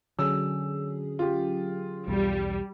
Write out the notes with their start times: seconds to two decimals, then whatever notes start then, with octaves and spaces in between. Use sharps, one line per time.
0.19 D3 F#3 C#4 G#4 E6
1.19 F4 G4
2.08 B1 E2 G3